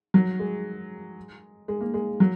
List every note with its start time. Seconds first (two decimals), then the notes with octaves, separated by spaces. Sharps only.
0.14 F#3
0.39 G#3
1.68 G#3
1.81 A#3
1.94 G#3
2.20 F#3